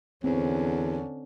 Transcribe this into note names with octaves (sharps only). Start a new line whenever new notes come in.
E2 D3 C4 C#4